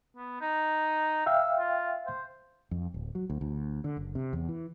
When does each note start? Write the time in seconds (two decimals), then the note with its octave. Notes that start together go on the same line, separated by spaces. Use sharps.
0.17 B3
0.41 D#4
1.26 E5 F5 G5 E6
1.59 F4
2.06 C5
2.71 F2
2.94 D1
3.15 F#3
3.30 D2
3.41 D2
3.84 D3
3.97 F#1
4.15 C3
4.33 E2
4.49 E3